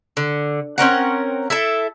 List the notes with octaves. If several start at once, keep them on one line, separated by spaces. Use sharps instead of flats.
D3
C4 C#4 A#4 F#5
E4 A4 E5